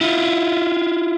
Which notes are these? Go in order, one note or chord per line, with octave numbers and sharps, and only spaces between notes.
E4 F4